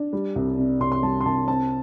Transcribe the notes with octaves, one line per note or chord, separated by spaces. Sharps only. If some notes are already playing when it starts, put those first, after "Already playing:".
Already playing: D4
G3
C2
C3
C2 C6
C6
G3 A5
C6
C2 A5
C4 A5